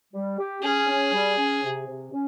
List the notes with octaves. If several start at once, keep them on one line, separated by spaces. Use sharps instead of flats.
G3
G4
C#4 G#4
C#4
G3
C#4
C3
C3
C#4